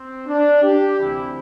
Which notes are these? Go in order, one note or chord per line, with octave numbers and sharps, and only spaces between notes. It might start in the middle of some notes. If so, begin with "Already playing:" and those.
Already playing: C4
D4
G4
D2 C3 E3 E4